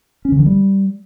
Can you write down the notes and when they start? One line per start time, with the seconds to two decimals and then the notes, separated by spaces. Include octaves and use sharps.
0.25 C#4
0.32 D3
0.39 E3
0.46 G3